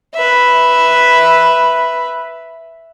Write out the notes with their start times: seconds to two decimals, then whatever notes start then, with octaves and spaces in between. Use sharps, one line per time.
0.14 B4 E5